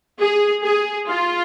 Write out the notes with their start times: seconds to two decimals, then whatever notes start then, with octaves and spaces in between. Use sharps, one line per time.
0.19 G#4
0.64 G#4
1.09 F4